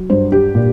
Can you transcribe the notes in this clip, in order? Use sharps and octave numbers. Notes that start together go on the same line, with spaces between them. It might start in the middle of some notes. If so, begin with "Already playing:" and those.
Already playing: F#3
G2 C5
G4
A#2